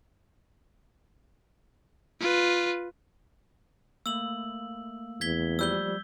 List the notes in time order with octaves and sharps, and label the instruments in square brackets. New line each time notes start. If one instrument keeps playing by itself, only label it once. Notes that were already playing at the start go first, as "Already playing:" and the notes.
[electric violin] F4 B4
[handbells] A3 A#3 [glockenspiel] E6 F#7
[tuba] E2 [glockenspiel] G#6 B6 G7
[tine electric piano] F3 G3 [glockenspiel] E6 G6 G7